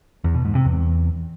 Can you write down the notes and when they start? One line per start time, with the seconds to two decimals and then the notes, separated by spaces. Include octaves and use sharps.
0.24 E2
0.35 B2
0.45 G#2
0.55 C3
0.65 E2